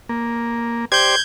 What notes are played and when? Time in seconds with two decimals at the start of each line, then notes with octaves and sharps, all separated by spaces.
0.09 A#3
0.92 G4 C5 D5 G6 G#6